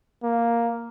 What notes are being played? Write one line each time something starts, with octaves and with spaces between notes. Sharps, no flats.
A#3